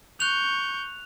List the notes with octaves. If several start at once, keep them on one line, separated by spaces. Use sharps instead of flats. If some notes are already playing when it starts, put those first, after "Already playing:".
C#6 F#6 G6 F7